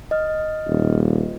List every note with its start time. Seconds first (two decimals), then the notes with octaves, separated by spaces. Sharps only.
0.11 D#5 F6
0.68 D#1